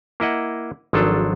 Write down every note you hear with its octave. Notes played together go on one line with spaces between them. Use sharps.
A#3 E4 D#5 F#5
G#1 F3 F#3 D4 F4 A4